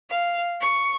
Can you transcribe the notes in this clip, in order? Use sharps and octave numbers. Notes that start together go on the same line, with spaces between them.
F5
C#6